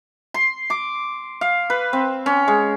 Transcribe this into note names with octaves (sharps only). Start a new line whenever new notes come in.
C6
D6
F5
B4
C4
C#4
G#3